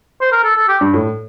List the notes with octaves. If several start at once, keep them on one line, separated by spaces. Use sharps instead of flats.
C5
A#4
A4
A4
G4
G2
A2